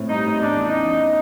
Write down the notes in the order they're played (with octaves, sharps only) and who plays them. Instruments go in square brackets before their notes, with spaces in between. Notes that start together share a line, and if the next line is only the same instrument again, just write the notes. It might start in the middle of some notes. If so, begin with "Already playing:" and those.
Already playing: [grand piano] A2 C4
[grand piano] G3 [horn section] D#4
[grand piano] A2
[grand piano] E2 [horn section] D4
[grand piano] E3
[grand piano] C#3 [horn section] D#4
[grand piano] E3